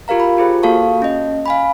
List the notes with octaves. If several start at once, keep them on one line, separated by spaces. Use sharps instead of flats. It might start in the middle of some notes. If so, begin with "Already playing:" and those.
F4 G4 A#4 F5 A#5
B5
F4 G4 G#4 C5
A#3 F#4 A4 F5 A5 C#6
C#4 D#5
F5 G#5 B5